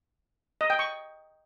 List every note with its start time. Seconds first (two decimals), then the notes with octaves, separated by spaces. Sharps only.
0.61 D#5
0.70 G5
0.79 C#6